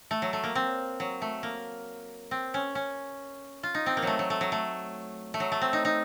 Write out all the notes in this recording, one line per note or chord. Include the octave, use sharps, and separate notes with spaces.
A3
F#3
A3
A#3
C4
F#3
A3
A#3
C4
C#4
C#4
F4
D#4
C4
A#3
F#3 A3
F#3
A3
F#3
A3
A3
F#3
A3
C4
D#4
D#4